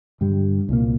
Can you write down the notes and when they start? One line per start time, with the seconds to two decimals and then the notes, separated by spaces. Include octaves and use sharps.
0.21 G2 D3 G3
0.69 C2 A#2 A#3